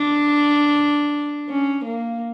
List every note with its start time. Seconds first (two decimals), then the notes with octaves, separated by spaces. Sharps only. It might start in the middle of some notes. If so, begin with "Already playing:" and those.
Already playing: D4
1.49 C#4
1.84 A#3